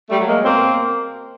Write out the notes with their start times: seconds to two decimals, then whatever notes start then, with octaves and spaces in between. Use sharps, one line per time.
0.09 G3 A3
0.18 F#3
0.27 G#3 A#3
0.45 B2 A#3 C4